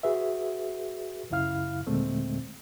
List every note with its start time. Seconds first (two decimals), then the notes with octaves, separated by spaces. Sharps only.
0.03 F#4 G#4 B4 E5
1.30 C#2 F#2 C#3 E4 F5 F6
1.87 D#2 A#2 D3 G#3 A3 C4